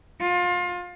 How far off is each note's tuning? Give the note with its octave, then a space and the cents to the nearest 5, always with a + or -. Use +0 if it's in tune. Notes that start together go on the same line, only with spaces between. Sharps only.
F4 +30